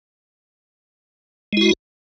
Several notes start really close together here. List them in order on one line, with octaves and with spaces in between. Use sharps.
G#3 E4 F#4